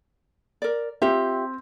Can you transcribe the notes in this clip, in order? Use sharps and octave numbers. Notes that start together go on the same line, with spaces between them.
A#4 D5
C4 F4 G4 E5